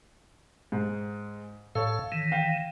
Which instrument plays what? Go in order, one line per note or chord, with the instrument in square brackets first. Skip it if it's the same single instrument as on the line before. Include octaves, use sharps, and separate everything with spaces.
[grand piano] G#2
[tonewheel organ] A2 F5 [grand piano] A4 C#5
[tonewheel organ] D#3 E3
[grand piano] F5 G5